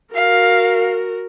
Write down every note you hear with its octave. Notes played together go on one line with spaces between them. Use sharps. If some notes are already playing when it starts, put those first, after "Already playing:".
F#4 A#4 F5